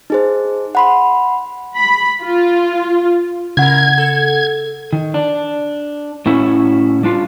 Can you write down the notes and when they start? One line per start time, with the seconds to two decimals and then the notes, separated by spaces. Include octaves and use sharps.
0.10 D#4 G#4 C5
0.75 F#5 B5 C6
1.76 B5
2.22 F4
3.57 C#3 E4 A#4 F#5 G#6
3.98 A4
4.93 D#3
5.14 D4
6.26 A2 C#4 E4 F#4
7.03 G3 D4 F4